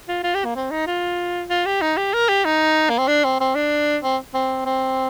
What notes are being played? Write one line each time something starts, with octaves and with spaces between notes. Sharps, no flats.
F4
F4
G4
A#3
C4
D#4
F4
F4
G4
D#4
G4
A#4
G4
D#4
A#3
C4
D4
C4
C4
D4
C4
C4
C4